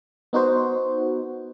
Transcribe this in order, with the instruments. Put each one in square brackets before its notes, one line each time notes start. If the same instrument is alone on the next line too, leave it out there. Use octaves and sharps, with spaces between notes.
[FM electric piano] B3 D#4 F#4 C5